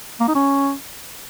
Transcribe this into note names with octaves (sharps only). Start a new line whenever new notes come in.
A#3
D#4
C#4